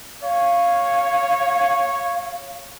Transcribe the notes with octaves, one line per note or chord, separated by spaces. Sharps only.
C#5 F5